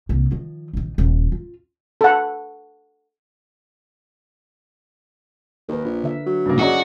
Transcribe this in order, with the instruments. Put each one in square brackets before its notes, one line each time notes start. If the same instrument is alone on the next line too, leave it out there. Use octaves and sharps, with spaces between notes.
[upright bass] C2 A#3
D#3 F3
A#1 D#3
D#1
F4
[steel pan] A4 F#5
[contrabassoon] D#2 [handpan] A#4 B4
[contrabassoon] A#1
[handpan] D3 E5
[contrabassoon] F#3
[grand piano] G2 C#3 A#3
[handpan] C#4 D5 [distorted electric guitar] F#4 [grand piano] G#4 D#5 A#5